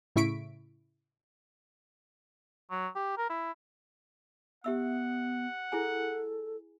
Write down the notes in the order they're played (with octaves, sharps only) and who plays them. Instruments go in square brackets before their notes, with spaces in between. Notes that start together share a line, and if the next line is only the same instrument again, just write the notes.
[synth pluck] A2 C#3 E4 C#6 B6 D7
[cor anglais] F#3
G4
A#4
E4
[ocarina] B3 [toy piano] G4 E5 E6 [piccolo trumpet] F#5
[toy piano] E4 G#4 G#5 [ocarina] A4